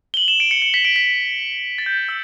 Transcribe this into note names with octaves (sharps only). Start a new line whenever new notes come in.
G7
F#7
E7
D7
C#7
C#7
B6
D7
B6
A6
G6
E6